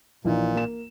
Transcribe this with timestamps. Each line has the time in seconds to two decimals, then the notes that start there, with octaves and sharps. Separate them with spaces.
0.25 A#1 A#2 E3 D#4
0.55 A#3 E7